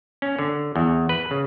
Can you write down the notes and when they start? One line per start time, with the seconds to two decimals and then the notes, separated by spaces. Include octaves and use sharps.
0.22 C#4
0.39 D3
0.76 E2
1.09 B4
1.31 C#3